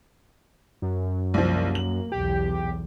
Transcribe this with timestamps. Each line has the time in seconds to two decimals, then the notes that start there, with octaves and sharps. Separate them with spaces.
0.82 F#2
1.34 C2 F3 A#3
1.75 F#7
2.12 B1 E2 G4